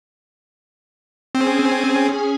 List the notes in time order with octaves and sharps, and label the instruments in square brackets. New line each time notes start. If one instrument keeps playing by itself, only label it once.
[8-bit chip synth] C4 [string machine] C#4 G#4 G#5